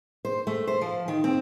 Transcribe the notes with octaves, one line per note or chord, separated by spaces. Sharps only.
C5
A3
C5
F3
D#3
C4